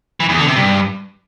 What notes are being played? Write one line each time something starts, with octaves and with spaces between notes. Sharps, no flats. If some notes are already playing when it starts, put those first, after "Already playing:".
E3
E2
D3
C3
G2